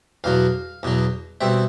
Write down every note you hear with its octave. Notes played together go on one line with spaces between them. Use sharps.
E2 B2 F#3 F5
E2 B2 F#3
B2 G3 C4 E5